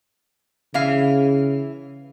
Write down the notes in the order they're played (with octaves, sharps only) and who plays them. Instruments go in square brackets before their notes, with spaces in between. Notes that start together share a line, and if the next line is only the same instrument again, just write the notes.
[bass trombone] C#3 [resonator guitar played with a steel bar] E3 E5 F5